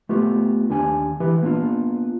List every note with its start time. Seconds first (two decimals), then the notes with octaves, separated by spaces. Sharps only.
0.09 A3 B3 F4 G4
0.70 D#2 D4 G4 G#5
1.20 E3 E4 G4 B4
1.42 A#3 B3 D4 D#4 F4